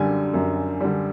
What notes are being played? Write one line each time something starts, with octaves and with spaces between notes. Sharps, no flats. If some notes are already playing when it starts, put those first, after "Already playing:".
Already playing: F#2 D3 G3 G#5
F#2
D3 G3